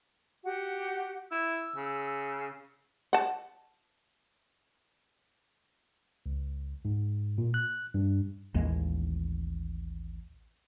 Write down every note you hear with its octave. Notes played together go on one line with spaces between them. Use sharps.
F#4 G4 F#5
E4 E6
C#3
F#5 A5
C#2
G#2
A#2
F#6
G2
A1 D#2 G#3 A#3